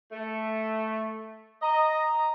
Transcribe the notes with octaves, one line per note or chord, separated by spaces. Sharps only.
A3
D#5 A#5